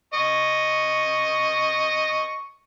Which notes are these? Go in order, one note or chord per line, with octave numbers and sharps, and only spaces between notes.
D#5 C#6